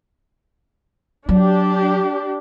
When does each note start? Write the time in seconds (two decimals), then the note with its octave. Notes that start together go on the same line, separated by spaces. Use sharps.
1.29 F#3 D4 G4